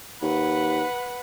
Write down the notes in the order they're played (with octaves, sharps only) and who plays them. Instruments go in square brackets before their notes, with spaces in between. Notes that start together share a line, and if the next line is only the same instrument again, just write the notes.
[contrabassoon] D#2 [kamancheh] B4 F#5